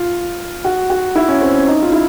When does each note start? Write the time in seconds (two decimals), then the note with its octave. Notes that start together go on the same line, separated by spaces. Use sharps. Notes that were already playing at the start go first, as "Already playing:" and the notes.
Already playing: F4
0.65 F#4
0.90 F#4
1.16 E4
1.28 C#4
1.41 C4
1.54 C#4
1.68 D#4
1.83 F4
1.92 E4